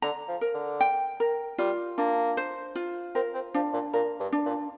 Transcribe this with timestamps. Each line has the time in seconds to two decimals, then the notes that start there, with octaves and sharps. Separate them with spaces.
0.02 D3 A#5
0.28 F3
0.41 A#4
0.54 D3
0.81 G5
1.20 A#4
1.58 G3 F4
1.98 A#3 D4
2.37 C5
2.75 F4
3.15 C4 A#4
3.34 C4
3.54 F3 D4
3.73 A#2
3.93 A#2 A#4
4.20 G2
4.33 D4
4.45 A#2